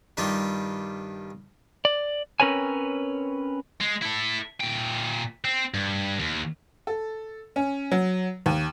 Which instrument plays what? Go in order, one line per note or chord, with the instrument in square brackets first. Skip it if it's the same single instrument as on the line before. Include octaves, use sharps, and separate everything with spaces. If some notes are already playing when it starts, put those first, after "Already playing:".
[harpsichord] G2 D#3 G3 F4
[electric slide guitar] D5
C4 C#4 A#4 B4 C#5 G#5
[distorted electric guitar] G#3
E4 A4
A#2 G5
C4
G2
D#2
[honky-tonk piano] A4
C#4
F#3
D#2